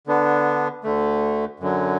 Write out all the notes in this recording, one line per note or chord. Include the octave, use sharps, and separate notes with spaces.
D3 B3 D4
D2 D3 A3
F#2 D3 F#3